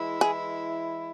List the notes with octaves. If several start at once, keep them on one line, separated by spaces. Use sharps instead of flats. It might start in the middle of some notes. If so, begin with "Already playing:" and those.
Already playing: E3 G#3 E4
G#4